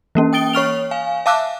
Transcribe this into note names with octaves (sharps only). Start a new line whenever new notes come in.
E3 A#3 C#4
G5 D#6 A6 D7 G7
C#5 C#6 F6 F7
F5 G#5
E5 F5 A5 D6 E6 F#6